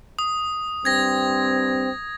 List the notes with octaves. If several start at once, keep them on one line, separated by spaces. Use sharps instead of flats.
D#6
G2 C4 G#6 A#6